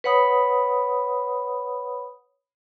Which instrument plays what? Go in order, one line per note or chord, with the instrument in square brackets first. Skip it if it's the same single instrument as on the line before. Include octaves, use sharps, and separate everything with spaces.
[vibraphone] B4 C#5 F#5 B5 D#6